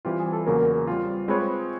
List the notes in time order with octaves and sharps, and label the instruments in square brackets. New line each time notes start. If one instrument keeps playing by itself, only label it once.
[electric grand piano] E3 G3 C4 F4 [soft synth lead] G4
[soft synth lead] G#4
A4
[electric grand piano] E2 C#3 F#3 A#3 [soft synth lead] A#4
[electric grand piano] G3 C4 F4
[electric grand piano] G#3 C4 F4 G#4 C#5 [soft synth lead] B4